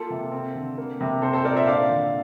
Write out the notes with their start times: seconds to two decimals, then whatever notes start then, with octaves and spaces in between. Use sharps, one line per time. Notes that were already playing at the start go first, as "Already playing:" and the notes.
Already playing: A#3 F4 A4
0.10 C3
0.32 C4
0.55 D3
0.78 A#3
1.01 C3
1.22 C4 A4 C5
1.33 A4 C5
1.45 A#2 A#4 D5
1.56 C5 E5
1.67 D4 D5 F5
1.90 D3